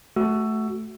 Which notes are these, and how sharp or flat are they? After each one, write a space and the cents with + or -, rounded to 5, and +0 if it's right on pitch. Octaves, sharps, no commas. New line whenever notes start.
A3 -15 F#4 +10 E6 +15